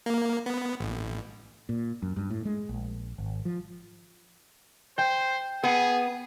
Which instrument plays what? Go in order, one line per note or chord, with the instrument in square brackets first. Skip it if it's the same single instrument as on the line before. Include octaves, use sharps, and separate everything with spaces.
[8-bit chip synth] A#3
B3
A1
[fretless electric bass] A#2
F#2
G2
A2
G#3
A#1
G#1
F3
[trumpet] C5 [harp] G5
[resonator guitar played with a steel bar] B3 [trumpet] G#4